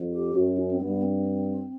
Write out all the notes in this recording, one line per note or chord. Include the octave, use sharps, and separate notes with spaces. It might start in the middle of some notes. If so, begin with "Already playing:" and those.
Already playing: F2
G4
F#2 F#4
C#4
C4
G2 B3
C4